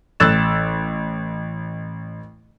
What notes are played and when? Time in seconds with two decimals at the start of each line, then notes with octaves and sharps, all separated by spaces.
0.20 A1 E6 F#6 A6 E7